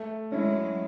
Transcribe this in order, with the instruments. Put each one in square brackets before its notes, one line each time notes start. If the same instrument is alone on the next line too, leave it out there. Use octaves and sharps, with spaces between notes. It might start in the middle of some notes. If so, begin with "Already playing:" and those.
Already playing: [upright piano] A3
[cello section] F#3 G#3 [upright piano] C#4 E4